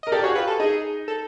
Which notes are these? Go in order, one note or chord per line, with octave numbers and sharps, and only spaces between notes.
D#5
A#4
G4 A4 D5
F#4 G#4 C#5
F4 G4 B4
A4
D#4 G#4
A4